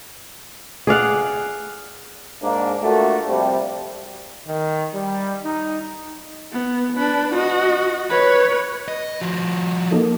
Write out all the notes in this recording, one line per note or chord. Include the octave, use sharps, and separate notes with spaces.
G#4 D5 F5 F#5
G#2 A#3 D4
A3 A#3 D4 F4 F#4 A4
C3 F3 G3
D#3
G3
D#4
B3
D4 B4
F#4 D#5
B4 C#5
D#5
F3 F#4
A#3 D#4 A4